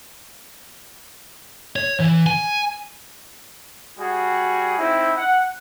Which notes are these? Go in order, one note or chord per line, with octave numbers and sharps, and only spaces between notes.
C#5
E3
G#5
G3 F#4 G#4
C4 D#4 E4
F#5